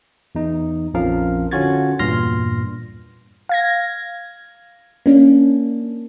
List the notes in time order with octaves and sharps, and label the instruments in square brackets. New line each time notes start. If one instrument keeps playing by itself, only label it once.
[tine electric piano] E2 D#4
A#1 F2 F3 C#4 A#4 F5
D3 C#4 F4 F#4 G#6 A6
E2 G2 A#2 C6 F6 A#6
[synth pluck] F5 G#6 A#6
A#3 C#4 D4